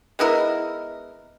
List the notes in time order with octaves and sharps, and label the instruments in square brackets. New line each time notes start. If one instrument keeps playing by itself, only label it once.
[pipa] G#3 B3 E4 A#4